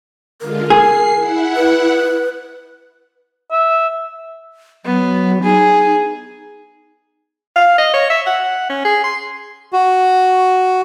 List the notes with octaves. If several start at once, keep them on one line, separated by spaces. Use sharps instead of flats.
D3 G#3 F4 A#4
G#4 C7
E4 F#5
B4
E5
F#3 B3
D#4 G#4
D#4
F5
D#5
C#5
E5
F#5
C#4
G#4
C6
F#4